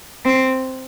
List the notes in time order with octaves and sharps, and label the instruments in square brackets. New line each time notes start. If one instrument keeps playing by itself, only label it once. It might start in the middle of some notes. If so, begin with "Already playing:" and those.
[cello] C4